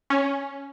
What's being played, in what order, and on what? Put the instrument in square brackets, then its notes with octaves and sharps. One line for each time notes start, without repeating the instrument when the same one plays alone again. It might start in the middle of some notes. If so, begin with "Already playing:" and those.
[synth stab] C#4